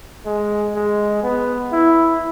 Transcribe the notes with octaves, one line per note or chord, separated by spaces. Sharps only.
G#3
G#3
B3
E4